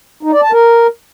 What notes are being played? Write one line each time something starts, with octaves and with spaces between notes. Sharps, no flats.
D#4
D5
A5
A#4